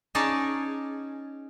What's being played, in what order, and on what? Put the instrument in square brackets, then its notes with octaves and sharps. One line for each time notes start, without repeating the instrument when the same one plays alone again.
[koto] C#4 D#4 G#4 D5 A5